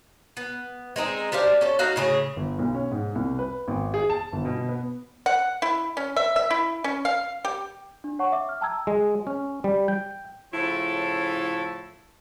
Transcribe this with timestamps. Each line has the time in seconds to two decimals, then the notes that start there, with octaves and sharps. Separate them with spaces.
0.37 B3
0.96 G#3 C4 D#4 G#4
1.32 D4 G4 C5 F5
1.61 C#4 A4
1.79 D#4 F#4 F5
1.96 A2 C#3 G#4
2.36 G1
2.59 B1
2.75 C#4
2.91 G#2
3.15 C2
3.39 B4
3.68 G#1
3.94 G#4
4.10 A5
4.33 G1
4.45 B2
4.69 B3
5.26 F#5
5.62 E4
5.97 C#4
6.16 E5
6.36 E5
6.51 E4
6.84 C#4
7.05 F5
7.45 G4
8.04 D4
8.19 C#5 F#5 A5 C#6
8.32 E5 D6
8.49 F6
8.61 G5 A5 A#5 D6 E6 G#6
8.87 G#3
9.27 C#4
9.64 G3
9.88 G5
10.53 A2 C#3 F3 E4 A4 C#5